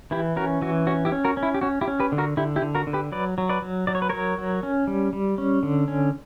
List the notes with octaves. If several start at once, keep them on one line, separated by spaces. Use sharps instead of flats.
E3 E4 G4
C#4 F#4 A#4
E3 F#4
C#4 F#4
E4 G4
C#4
F#4 A#4
C#4
E4
G4
C#4 F#4
E4 G4
C#4
G4 B4
D3
F#4 A#4
D3 E4 G4
E4 G4
D3
F#4 A#4
D3
G4 B4
F#3 B4 D5
F#3
B4 D5
F#3
F#3 D5
C#5
B4
F#3 A#4 C#5
F#3
C#4
G3
G3
C#4
D3
C#4